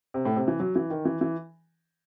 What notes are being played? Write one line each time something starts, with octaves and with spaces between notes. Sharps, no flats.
C3
A2
C3
E3
F#3
E3
D#3
E3
E3